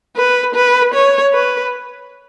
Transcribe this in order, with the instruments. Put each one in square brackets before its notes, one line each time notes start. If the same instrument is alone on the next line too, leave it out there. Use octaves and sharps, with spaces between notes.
[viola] B4
B4
C#5
B4